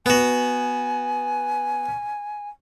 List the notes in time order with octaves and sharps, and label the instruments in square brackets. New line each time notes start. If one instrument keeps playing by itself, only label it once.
[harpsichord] B3 F#4 [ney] G#5